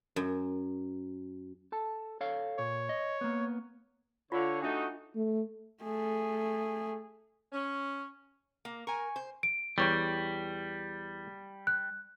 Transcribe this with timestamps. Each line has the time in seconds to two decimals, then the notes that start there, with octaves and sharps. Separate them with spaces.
0.16 F#2
1.72 A4 A5
2.21 A4 C#5 F5
2.59 A#2 C#5
2.89 D#5
3.21 A#3 B3
4.32 D3 F4 C#5 F5
4.62 A3 D4 D#4 F#4 E5 D6
5.16 A3
5.83 A3 G#4
7.53 C#4
8.65 A#3
8.87 A#4 G#5 C#6
9.16 C5
9.43 D7
9.78 E2 G3 C#5 G5
11.67 F#6